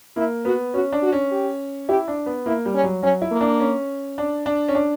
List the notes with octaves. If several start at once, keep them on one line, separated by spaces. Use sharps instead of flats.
A#3 E4
B3 F#4
C#4 F#4
D4
F#4
C#4
G4
E4 G4
D4
B3
A#3 E4
G3
C#4
F#3
F#3 C#4
E4
A#3
D4
C#4
D4
D4
C#4
D4